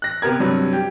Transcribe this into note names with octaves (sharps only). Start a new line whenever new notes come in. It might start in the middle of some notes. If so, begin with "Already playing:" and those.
F#6 A#6
C3 B3 G4 A#4 G#6
G2 C3 F#3
G4